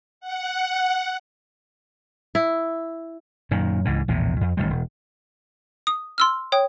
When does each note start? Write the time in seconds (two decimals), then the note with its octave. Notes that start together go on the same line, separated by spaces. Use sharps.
0.21 F#5
2.35 E4
3.51 F#2 A#2 D#3
3.85 C#2 G#2 E3
4.08 A#1 E2 A2 C3
4.41 F2
4.57 A1 A2 D#3 G3
4.70 E1
5.87 D#6
6.18 C6 E6 F6
6.52 C#5 G5 D#6